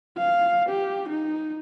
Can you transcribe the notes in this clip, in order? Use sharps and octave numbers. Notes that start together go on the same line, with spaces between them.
F5
G4
D#4